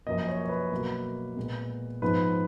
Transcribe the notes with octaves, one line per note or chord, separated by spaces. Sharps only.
F#2 F3 A#3 D#5
C#5
C#5
B4
B2 F#3 A#3
A#2 G#3 B3
G#2 F3 G#3 B3 B4